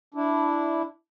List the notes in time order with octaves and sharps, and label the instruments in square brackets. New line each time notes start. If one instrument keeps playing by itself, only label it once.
[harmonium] D4 E4